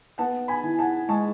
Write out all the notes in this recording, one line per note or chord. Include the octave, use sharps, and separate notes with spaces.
B3 F#5 A5
G#5 B5
E3
F#5 A5
G#3 A5 C#6